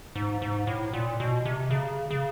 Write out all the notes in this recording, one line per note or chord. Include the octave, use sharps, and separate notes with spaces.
G#2
G#2
A2
A#2
B2
C3
C#3
C#3